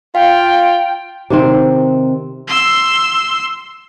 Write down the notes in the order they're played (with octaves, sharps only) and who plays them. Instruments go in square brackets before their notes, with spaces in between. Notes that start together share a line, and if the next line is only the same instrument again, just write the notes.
[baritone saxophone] F4 [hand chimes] F5 [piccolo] G5
[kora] C3 D#3 C4
[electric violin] C6 E6